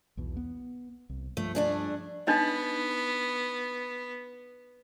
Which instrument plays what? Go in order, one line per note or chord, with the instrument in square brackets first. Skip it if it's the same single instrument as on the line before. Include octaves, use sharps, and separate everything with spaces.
[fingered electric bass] B1 E2 B2
B3
C2
[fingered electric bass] G2 F3 [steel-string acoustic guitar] A3
[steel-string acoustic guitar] A3 D4 G#4
[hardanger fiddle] B3 [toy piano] D4 D#4 D#5